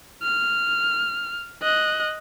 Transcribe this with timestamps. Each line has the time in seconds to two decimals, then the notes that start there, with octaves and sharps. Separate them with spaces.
0.23 F6
1.62 D#5 F#6